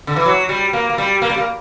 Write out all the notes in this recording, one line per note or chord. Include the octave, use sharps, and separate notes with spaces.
D3
E3
F#3
G3
A#3
A#3
G3
A#3
G3
A#3